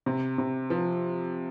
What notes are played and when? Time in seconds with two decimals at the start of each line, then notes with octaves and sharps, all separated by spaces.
0.06 C3
0.38 C3
0.70 F3